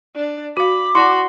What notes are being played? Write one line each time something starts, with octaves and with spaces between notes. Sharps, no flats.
D4
F#4 F5 B5 D6
E4 F#4 D5 A5 C6